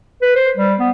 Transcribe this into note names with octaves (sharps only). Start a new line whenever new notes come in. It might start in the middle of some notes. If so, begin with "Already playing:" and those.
B4
C5
G3
B3